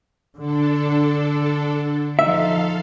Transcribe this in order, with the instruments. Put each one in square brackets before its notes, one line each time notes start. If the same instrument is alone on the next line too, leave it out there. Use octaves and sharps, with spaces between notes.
[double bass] D3 [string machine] D4 A4
[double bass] F3 D#4 [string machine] A4 F5 [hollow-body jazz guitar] E5